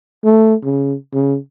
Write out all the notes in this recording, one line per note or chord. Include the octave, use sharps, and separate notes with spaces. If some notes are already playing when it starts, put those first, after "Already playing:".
A3
C#3
C#3